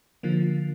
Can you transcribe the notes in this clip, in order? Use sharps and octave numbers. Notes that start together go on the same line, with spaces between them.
D3 F3 A#3